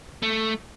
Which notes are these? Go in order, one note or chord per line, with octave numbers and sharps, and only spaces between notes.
A3